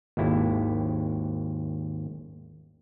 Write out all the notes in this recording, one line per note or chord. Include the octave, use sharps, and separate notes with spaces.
G#1 D#2 E4